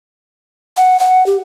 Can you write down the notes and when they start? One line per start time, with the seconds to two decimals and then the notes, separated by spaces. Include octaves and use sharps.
0.77 F#5
1.00 F#5
1.26 G4